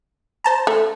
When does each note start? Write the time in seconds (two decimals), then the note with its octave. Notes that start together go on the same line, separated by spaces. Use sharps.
0.44 C5 A5 A#5
0.67 A3